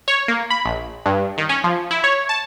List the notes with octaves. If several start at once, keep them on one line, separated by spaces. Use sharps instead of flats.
C#5
A#3
B5
A#1
G2
D#3
C#4
F3
E4
C#5
A5